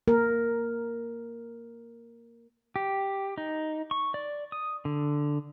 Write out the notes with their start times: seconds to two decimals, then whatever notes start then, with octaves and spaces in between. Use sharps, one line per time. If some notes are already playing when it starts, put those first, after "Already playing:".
0.08 A#3 A#4
2.76 G4
3.38 D#4
3.91 C#6
4.14 D5
4.52 D#6
4.85 D3